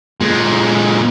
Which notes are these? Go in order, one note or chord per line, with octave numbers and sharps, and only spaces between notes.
A#2 G#3